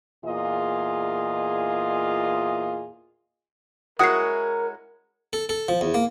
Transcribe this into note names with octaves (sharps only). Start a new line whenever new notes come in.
E2 A#2 F4 G#4 D#5
G#3 C#4 E4 F#4 A#4 F#5 D#6 C7
A4
A4
F3
E2
A#3